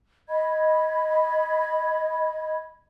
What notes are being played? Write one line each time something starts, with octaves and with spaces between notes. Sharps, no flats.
D#5 B5 G#6